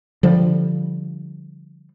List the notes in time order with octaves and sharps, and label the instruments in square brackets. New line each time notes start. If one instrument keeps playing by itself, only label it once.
[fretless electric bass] D3 F3 G3